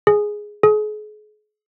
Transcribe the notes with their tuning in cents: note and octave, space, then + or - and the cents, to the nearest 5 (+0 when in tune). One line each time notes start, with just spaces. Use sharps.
G#4 +5
G#4 +40